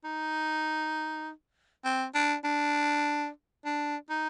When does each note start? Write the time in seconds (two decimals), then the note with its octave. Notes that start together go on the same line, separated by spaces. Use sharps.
0.04 D#4
1.85 C4
2.15 D4
2.44 D4
3.65 D4
4.10 D#4